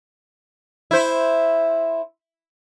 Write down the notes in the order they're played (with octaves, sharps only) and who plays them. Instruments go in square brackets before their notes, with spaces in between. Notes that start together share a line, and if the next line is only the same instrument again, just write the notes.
[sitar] E4 C5